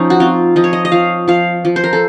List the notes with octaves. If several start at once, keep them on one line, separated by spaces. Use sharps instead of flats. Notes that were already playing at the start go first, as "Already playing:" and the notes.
Already playing: F3 C#4 D#4
F#4
C4 F4
F3 D#5
C#5
D#5
D#5
F3 F5
F3 F5
F3
C5
A#4
A4